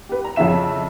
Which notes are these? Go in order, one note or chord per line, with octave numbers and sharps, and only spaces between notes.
G4 B4
A#5
F2 C#3 E4 E5 E7